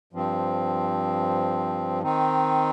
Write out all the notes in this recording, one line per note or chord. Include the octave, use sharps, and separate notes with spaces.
G2 F3 C4
D#3 C4 D#4